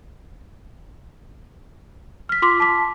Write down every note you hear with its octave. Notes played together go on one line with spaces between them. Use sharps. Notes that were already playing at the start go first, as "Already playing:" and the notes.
F6 B6
F4 C6 D6 B6
A5 D6 B6